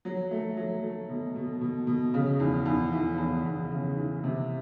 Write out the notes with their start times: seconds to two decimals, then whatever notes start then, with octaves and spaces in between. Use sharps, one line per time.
0.05 F#3
0.31 A3
0.57 F#3
0.82 A3
1.09 B2
1.35 B2
1.61 B2
1.87 B2
2.14 C#3
2.40 E2
2.66 E2
2.93 E3
3.18 E2
3.45 E2
3.71 C#3
3.96 E3
4.24 C3